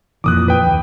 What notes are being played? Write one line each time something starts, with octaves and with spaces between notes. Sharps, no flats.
F2 A#2 E3 D6 D#6 F#6
B4 G5
D#2